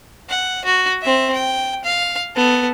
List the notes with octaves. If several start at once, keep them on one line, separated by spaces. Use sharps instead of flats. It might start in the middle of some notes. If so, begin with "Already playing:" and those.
F#5
F#4
C4 E5
G5
F5
B3 A4